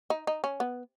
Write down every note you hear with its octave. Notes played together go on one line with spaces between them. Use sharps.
D#4
D#4
C#4
B3